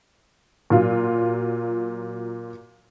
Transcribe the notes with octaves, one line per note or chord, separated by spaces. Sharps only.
A#2 F#3 F4